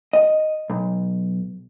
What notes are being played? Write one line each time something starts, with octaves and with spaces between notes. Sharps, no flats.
D#5
B1